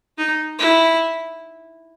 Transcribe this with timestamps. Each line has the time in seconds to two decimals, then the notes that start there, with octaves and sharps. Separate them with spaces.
0.18 D#4
0.59 E4